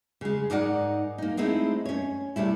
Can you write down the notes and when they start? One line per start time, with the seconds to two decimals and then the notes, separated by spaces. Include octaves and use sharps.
0.21 C#3 G#3
0.50 G#2 D#4 A#4 D5 F#5
1.18 A#3 D#4
1.37 G#3 A3 C4 D#4 E4
1.85 C#4 C#5
2.36 C3 G3 A3 E4